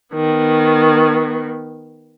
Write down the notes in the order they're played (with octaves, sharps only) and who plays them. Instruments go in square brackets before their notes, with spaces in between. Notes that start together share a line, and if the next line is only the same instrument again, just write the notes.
[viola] D#3 B3